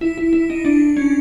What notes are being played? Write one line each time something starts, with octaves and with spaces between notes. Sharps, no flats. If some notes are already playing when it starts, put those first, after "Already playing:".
E4
E4
E4
D#4
D4
C#4